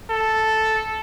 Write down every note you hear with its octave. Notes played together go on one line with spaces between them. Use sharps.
A4